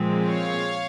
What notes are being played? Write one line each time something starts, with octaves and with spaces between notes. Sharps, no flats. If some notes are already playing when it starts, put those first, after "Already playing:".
Already playing: A#2 F3 G#3 C4
C#5 F5